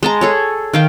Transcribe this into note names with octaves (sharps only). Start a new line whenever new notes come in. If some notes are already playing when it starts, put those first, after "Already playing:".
G#3 A5 A#5
G#4 A4 C#5
D#3 F5 G5